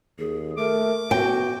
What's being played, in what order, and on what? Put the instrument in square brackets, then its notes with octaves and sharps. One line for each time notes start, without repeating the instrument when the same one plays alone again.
[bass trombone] D#2 [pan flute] G#4
[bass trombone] A3 [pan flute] A#4 [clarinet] D6
[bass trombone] B3 [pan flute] F#4 [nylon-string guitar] G5